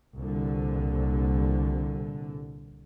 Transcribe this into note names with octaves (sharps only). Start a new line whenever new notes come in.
C2 A#2 D3